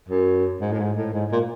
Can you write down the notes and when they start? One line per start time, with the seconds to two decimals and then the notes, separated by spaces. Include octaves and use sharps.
0.09 F#2
0.61 G#2
0.72 A2
0.79 G#2
0.97 A2
1.13 G#2
1.32 A#2